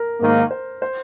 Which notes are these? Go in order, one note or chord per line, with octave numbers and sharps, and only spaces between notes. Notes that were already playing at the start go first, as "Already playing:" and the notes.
Already playing: A#4
G#2 D#3 A#3
C5
C5